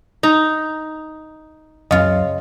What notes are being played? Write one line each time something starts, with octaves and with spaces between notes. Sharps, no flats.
D#4 A#5
C#2 F#2 C#3 F4 D#5 F5